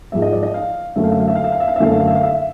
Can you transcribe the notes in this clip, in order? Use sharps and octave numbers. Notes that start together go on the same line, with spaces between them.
G#2 F3 G#3 E5
D#5
D5
D#5
F5
F#2 D3 F#3 A3 E5
F5
E5
F5
E5
F5
E5
F5
E5
F5
E5
F#2 D3 F#3 A3 F5
E5
F5
E5
F5
E5